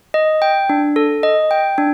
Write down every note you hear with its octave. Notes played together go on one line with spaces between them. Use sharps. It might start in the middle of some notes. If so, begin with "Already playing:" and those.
D#5
G5
D4
A4
D#5
G5
D4